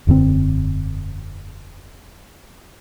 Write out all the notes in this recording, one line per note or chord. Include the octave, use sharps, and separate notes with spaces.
E1 F#2 D3 C4